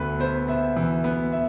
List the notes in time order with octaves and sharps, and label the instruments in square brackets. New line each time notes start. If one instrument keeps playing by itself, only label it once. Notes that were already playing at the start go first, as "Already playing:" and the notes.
Already playing: [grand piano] D2 B3 A4 B4
B3 C5
B3 E5
E3
B3
E5